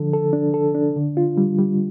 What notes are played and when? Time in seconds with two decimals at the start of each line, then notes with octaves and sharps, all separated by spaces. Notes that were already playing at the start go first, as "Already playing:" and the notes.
Already playing: D3 F3 D4 A4
0.13 A4
0.33 D4
0.54 A4
0.75 D4
0.96 D3
1.17 F4
1.37 G3
1.58 G3